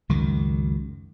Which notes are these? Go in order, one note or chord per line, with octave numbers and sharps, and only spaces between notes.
C#2 F#2 D#3